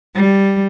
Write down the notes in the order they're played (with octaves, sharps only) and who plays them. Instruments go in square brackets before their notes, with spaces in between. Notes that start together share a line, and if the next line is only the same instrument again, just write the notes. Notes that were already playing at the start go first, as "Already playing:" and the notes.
[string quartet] G3